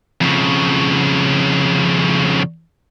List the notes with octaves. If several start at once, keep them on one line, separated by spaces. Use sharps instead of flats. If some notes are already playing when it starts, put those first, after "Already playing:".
F2 C#3